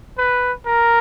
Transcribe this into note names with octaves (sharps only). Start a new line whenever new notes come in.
B4
A#4